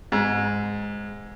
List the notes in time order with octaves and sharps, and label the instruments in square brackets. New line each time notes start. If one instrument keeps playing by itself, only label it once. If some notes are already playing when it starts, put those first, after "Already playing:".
[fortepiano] G#2